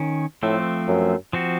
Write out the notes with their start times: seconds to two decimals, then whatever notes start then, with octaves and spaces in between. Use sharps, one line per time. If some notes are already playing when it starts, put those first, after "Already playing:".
Already playing: D#3 C#4
0.43 A2 F3 A3 C4
0.88 F#2
1.33 F3 C4 F#4